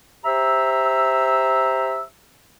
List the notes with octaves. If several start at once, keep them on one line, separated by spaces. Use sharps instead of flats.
G4 C5 E5 A#5 E6